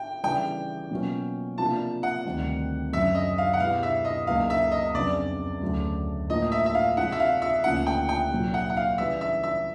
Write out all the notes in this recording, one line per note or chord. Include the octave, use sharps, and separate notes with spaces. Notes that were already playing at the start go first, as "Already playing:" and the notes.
Already playing: G5
C#3 E3 G3 G5
B2 F#3 A#3 C#4 F4
C3 F3 A#3 D4 F4 A5
F#5
D2 C3 D#3 G3 C4
F#2 C#3 F#3 E5
D#5
F5
F#5
B2 G#3 B3 E4 G4 F5
E5
D#5
C#2 C#3 F#3 A#3 D#4 F5
E5
D#5
F2 C#3 F#3 B3 D4 D5
D2 C#3 F#3 A3
A2 F3 A#3 D#5
E5
E5
F5
C3 F3 G#3 F#5
E5
F5
E5
D2 C#3 F3 A#3 C#4 F#5
G5
G5
C2 A#2 F#3
F#5
F#5
F5
C#3 E3 G3 E5
E5
E5